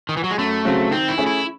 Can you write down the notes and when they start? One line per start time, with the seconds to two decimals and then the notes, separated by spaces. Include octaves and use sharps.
0.09 D#3
0.17 E3
0.24 F#3
0.31 G#3
0.38 F#2 A3
0.65 C#3 F#3 C4 F#4
0.91 D#3 C4
1.08 E4
1.18 A3 C#4 G#4
1.27 E4